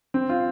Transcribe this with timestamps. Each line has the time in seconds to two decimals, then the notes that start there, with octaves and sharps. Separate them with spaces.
0.14 C4
0.29 F4